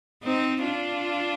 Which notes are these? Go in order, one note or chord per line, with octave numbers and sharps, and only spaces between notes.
C4 D#4
D4 F4